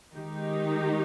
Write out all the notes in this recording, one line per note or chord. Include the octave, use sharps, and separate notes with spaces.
D#3 G#3 D#4 G4